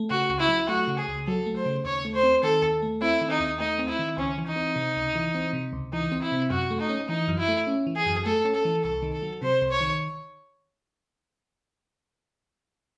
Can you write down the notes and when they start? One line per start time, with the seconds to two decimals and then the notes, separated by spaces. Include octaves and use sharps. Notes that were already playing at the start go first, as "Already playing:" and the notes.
Already playing: A3
0.10 C#3 F#4
0.30 C#2
0.39 E4
0.49 F#3
0.69 A3 F#4
0.87 C#3
0.98 G#4
1.08 C#2
1.27 F#3 A4
1.46 A3
1.56 C5
1.66 C#3
1.85 D#2 C#5
2.05 A3
2.14 C5
2.23 C4
2.43 D#3 A4
2.62 D#2
2.82 A3
3.01 C4 E4
3.21 D#3
3.30 D#4
3.40 D#2
3.59 A3 D#4
3.79 C4
3.88 E4
3.99 D#3
4.17 C#2 C#4
4.38 E3
4.47 D#4
4.56 C4
4.76 C3
4.96 C#2
5.15 E3
5.35 C4
5.53 C3
5.73 C#2
5.93 E3 D#4
6.12 C4
6.22 E4
6.32 C3
6.50 F#2 F#4
6.70 A3
6.80 D#4
6.89 C#4
7.09 E3 D#4
7.28 F#2
7.38 E4
7.48 A3
7.67 C#4
7.87 E3
7.96 G#4
8.06 F#2
8.25 A3 A4
8.45 C#4
8.55 A4
8.65 E3
8.84 C2 A4
9.03 D#3
9.13 A4
9.22 F#3
9.42 C3 C5
9.62 C2
9.72 C#5
9.81 D#3